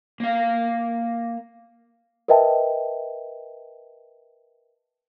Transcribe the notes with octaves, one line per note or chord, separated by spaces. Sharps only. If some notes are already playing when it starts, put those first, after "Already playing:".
A#3 F5
A#4 B4 D#5 E5 G5 A5